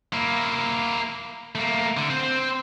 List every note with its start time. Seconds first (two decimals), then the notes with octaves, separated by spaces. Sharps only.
0.13 A#3 E4
1.55 A3 A#3
1.97 D3
2.10 C4 C5